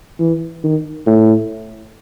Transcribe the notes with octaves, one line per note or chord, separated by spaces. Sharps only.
E3
D#3
A2